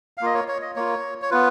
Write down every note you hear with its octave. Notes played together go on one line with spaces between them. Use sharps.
F5
A#3 F4 D#5
C#5
C#5
D#5
A#3 F4 C#5
C#5
B3 F4 B4